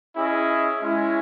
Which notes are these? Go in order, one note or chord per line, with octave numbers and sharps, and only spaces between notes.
C#4 E4 G#4 D#5
G#3 C#4 E4